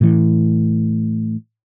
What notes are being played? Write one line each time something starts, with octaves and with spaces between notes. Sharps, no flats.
A2 E3